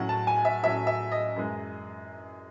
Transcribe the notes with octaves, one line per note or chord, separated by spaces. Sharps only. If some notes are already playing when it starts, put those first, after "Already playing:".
Already playing: A2 F#3 C#4 F#5
A5
G#5
E5
A2 F#3 C#4 E5
E5
D#5
F#2 E3 G#3